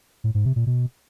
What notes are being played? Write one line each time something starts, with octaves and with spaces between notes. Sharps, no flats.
A2
G#2
C3
A#2
B2